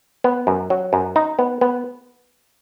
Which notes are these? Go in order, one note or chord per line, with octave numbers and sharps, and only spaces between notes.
B3
F#2
F#3
F#2
D#4
B3
B3